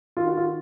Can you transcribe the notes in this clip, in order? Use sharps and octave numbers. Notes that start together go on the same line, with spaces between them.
D#3 F4
F#4
F4